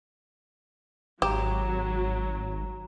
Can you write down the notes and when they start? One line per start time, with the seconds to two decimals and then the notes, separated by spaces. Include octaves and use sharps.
1.22 G#1 F#3 G4 A#5 E7